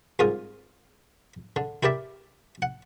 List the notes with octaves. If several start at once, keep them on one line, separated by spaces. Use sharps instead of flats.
C2 G#2 F4 A#4 D#6
D3
E4 G4 A#4 D5 E5
F#5